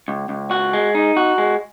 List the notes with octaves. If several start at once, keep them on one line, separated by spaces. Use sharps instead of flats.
C#2
C#2
F#4
G#3
D#4
F#4
G#3